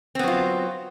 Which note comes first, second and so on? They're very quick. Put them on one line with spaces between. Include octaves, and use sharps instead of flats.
C4 B3 F#3 F4